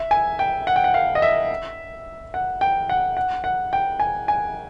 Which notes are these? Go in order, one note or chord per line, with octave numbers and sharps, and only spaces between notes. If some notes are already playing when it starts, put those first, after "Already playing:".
Already playing: E5
G#5
G5
F#5
G5
F#5
F5
D#5
E5
F#5
G5
F#5
F#5
F#5
G5
G#5
G#5